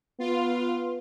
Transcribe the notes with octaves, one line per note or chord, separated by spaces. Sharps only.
B3 F4